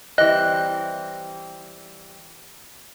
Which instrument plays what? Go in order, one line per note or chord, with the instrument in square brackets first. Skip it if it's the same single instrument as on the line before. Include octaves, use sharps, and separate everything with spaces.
[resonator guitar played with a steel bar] E3 G3 C4 [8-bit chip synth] D#5 F#6